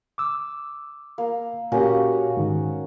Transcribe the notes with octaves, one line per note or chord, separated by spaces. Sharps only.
D6 E6
A#3
A#2 A#3 C#4 F#4 G4
G#2 D#3